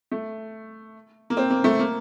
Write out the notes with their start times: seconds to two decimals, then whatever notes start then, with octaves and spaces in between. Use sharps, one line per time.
0.12 A3
1.30 A#3
1.37 C4
1.51 A#3
1.64 A3
1.79 A#3